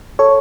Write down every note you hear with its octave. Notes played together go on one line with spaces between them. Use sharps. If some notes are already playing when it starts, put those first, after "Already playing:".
A4 C#5